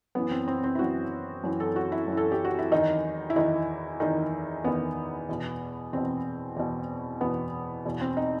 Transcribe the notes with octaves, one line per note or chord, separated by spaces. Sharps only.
F#2 E3 B3
C4
C4
C4
E4
F#2 E3 F#4
F#2 E3
A4
F#4
E4
F#2 E3
A4
G4
F#4
E4
E2 D#3 D#4
E4
E2 D#3 D#4
E2 D#3 D#4
E2 D#3 B3
E2 B2
E2 B2 C4
E2 B2
E2 B2 B3
E2 B2
C4
D#4